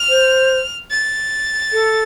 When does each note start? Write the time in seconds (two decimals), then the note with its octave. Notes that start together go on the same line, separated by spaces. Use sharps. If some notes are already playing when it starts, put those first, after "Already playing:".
Already playing: F6
0.08 C5
0.91 A6
1.72 A4